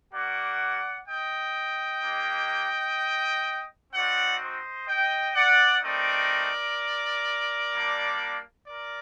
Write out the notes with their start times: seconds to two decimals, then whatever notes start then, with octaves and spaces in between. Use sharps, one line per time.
0.13 A#3 F#4 D5 F#5
1.08 D#5 G5
2.02 A#3 D#4 G4
3.92 C4 D#4 F#4 D5 F#5
4.40 C5 D#5
4.88 D#5 G5
5.35 D5 F#5
5.82 A3 C4 D#4 A#4 D5
7.72 G3 A#3 D4
8.67 A#4 D5